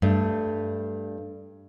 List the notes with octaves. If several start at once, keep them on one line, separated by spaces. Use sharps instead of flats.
G2 A3